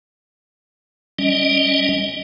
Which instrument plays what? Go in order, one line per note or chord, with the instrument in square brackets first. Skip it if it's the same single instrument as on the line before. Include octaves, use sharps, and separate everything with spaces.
[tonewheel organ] G3 C#4 D#5